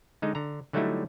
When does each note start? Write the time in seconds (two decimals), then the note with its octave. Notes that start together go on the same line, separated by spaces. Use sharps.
0.22 D3 G#3 D#4
0.35 D3 A#5
0.73 D3 F#3 G3 A3 D#4 E4